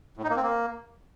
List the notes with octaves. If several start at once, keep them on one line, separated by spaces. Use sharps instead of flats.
A2
D#4
A#3
C4
A#3